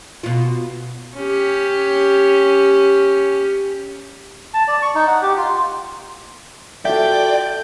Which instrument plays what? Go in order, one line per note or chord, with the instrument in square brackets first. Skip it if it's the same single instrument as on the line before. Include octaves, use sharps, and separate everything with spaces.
[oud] B2 F4
[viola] C#4 G4
[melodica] A5
D5
C#6
D#4
F#5
G4
F4
[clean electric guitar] F4 F#4 E5 [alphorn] A4 [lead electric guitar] D5 [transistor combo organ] G5